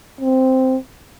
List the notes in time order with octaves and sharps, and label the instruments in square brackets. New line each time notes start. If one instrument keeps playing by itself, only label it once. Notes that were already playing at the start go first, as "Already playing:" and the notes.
[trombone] C4